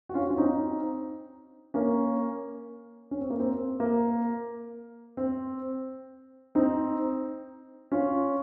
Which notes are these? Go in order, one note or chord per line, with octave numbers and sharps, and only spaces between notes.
F#4
C#4 F4
C#4
C4 D#4
A#3 C#4
C#4
C4
A#3
C4
A#3
C4
C4 D#4
C#4 F4